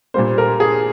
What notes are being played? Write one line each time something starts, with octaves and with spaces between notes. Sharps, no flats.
A#2 G3 A#3 C5
A#4
G#4